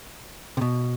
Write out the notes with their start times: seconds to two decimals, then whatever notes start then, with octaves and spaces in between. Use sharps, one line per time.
0.57 C3
0.61 B2